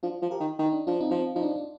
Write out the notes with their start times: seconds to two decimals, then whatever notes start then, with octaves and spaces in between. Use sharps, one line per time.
0.03 F3 D4 F4
0.22 F3
0.31 G4 A#4
0.40 D#3
0.59 D#3
0.66 D#4
0.73 D4
0.87 F3 D4 F4
1.01 C4 D#4
1.11 F3 C4
1.36 F3 D#4
1.43 D4
1.56 D4